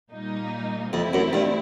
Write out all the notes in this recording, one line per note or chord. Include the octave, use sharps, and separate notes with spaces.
A#2 G3 A#3 D#4
F2 E3 A3 C4 E4
F#2
G2